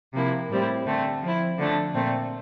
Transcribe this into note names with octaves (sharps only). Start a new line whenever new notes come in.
C3 F3 A#3 E4
A2 G3 C4 E4
D3 A3 C4
F3 C4 E4
D3 F3 A3 D4
A#2 A3 C4